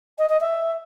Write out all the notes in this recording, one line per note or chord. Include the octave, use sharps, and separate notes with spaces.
D#5
D#5
E5